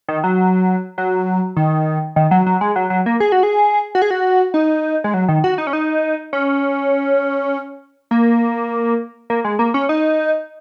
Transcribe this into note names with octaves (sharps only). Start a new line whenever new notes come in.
D#3
F#3
F#3
D#3
D#3
F#3
F#3
G#3
F#3
F#3
A#3
G#4
F#4
G#4
F#4
G#4
F#4
D#4
G#3
F#3
D#3
F#4
D#4
C#4
D#4
C#4
A#3
A#3
G#3
A#3
C#4
D#4